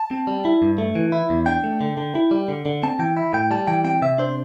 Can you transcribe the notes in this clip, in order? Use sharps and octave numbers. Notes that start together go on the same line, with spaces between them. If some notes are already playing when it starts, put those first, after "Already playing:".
Already playing: A5
C4
G3
E4
G2
A3
E3
E4
E2
D4 G5
A3
D3
D3
E4
G3
D3
D3
C4 A5
E3 G5
E4
A2 G5
G3 A5
E3 G5
C4 G5
C3 E5
D4 C5